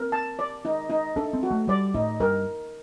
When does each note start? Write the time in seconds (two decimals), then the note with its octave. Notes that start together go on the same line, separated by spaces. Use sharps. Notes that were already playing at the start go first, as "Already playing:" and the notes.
Already playing: C4 A#4
0.12 A5
0.39 D5
0.65 D#4
0.90 D#4
1.16 D4 A4
1.33 C4
1.43 F#4
1.51 A3
1.68 G3 D5
1.94 A2 D#4
2.20 G2 A#4